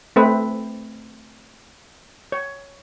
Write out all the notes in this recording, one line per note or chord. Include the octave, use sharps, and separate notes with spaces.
A3 C4 B4
C#5